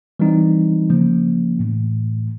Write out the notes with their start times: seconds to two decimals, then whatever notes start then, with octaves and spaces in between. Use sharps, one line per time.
0.19 E3 G3 C4 D#4
0.89 C#3 F3 A#3 C#4
1.59 A2 E3 A3